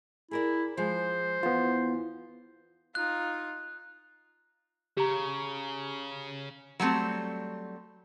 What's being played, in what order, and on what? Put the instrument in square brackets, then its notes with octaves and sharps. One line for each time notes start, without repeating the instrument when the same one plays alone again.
[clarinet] E4 [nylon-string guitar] G#4 A#4 D5
[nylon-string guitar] F3 G#3 G#4 [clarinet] C5
[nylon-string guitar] E2 [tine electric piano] B3 F4
[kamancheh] D#4 F4 [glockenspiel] F#6
[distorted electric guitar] C#3 [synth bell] G4 A#5
[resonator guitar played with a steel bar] F#3 G3 A3 C4